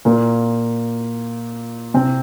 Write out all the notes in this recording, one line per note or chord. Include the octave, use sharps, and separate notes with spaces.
A#2 A#3
C3 C4